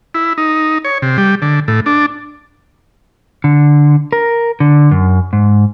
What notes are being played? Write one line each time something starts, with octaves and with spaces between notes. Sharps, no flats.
E4
D#4
C#5
C3
G3
D3
A2
D4
D3
A#4
D3
F#2
G#2